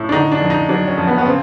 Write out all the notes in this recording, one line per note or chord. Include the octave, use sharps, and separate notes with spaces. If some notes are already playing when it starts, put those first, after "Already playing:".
Already playing: A2
D4
D3 D#4
D4
F2
D#4
F#3 D4
C#4
F2
B3
B3
C#3 C4